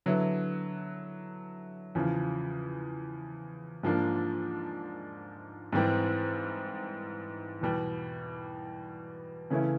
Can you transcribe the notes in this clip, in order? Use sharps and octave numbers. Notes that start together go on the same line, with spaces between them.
D3 F#3 B3 E4
E2 C#3 F3
G#2 F3 A#3 D4
G#2 E3 G3 C4
E2 B2 G3
C#3 E3 A3 C#4 E4